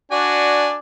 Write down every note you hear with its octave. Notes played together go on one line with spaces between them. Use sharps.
D4 F#4 D5 G#5